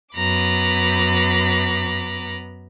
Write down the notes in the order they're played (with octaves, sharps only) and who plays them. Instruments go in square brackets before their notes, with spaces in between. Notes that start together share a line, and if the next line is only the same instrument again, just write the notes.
[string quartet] F#2 B3 A#5 B5 D6